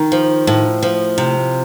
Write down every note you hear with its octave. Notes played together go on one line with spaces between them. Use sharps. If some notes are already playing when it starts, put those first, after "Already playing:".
Already playing: D#3
F3
A2
F3
C3